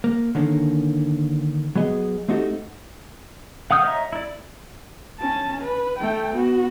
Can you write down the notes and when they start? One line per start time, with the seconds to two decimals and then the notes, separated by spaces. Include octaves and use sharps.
0.04 A#3
0.35 D3 D#3 A#3 C#4
1.76 F#3 B3 G#4 D#5
2.28 A3 C4 D#4 F#4 G4 A4
3.71 F5 F#5 D#6 F6 G6
3.83 C#5 D#5 E5 A#5
4.13 E4 D5
5.20 C#4 A5
5.62 B4
5.99 A3 G5
6.35 B3 F#4